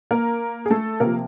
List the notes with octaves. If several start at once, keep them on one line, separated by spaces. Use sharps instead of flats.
A#3 A#4
G#4
A3 A4
C3 F3 A#3 A#4